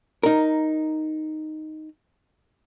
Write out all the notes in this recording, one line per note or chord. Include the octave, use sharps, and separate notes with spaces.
D#4 A#4